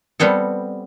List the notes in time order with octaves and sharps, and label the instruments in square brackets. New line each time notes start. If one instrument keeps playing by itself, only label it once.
[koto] G3 B3 C4 A4